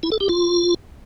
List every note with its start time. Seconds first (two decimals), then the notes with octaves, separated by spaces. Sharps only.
0.03 E4
0.12 A4
0.20 G4
0.29 F4